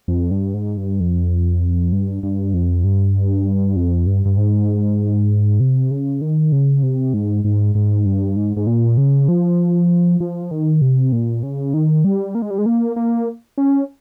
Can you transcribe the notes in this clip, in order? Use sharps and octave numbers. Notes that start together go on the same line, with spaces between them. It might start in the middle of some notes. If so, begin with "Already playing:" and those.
F2
G2
G#2
G2
F2
G2
G2
F2
G2
F2
G2
G2
G#2
C3
C#3
D#3
C#3
C3
G#2
G#2
G#2
G2
G#2
G#2
A#2
C#3
F3
F3
D#3
C3
A#2
C#3
D#3
G3
A#3
G#3
G3
G#3
A#3
A#3
C#4